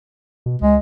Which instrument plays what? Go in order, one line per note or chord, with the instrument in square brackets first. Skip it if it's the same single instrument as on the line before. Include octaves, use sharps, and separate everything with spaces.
[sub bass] B2
[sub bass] C#2 [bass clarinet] G#3